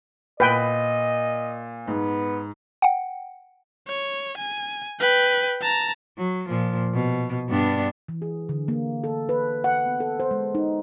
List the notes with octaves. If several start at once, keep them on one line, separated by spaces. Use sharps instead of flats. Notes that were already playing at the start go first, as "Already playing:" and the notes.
A#2 B4 D#5 G5
G#2 B3
F#5 G5
C#5
G#5
B4 G5
A5 A#5
F#3
A#2 F3
B2
G2 B3 D4
E3
G#4
D3
A#3
A4
B4
F#5
B3
A4
C5
G#3
D#4